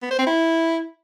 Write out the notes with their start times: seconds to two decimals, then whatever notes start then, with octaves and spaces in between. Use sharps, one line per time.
0.02 B3
0.10 C5
0.19 C4
0.27 E4